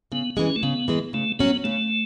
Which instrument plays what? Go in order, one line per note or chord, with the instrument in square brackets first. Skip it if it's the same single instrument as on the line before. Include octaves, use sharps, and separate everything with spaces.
[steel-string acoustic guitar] C#3 [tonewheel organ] B3
[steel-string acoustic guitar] E3 G#3 [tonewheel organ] C#4
[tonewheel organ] A3
[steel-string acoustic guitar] C#3 [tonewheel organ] B3
[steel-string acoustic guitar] E3 G#3
[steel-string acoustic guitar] C#3 [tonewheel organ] A3
[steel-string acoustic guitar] F#3 C#4 F#4 [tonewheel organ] B3
[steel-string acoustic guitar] C#3 [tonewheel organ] A3